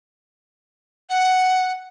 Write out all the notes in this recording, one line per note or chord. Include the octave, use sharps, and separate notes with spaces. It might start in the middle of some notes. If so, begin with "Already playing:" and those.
F#5